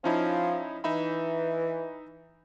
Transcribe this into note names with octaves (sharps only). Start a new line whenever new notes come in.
F3 C#4 D#4 E4
E3 D#4 E5 B5